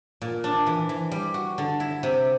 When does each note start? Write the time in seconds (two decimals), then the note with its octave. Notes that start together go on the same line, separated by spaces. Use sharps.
0.21 A#2
0.44 D4
0.67 E3
0.89 E3
1.11 G3
1.34 F#4
1.58 D3
1.80 E4
2.03 C3